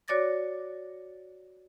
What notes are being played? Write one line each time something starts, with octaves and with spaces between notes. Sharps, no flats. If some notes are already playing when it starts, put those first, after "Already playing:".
F#4 C#5 D5 D6 A6 A#6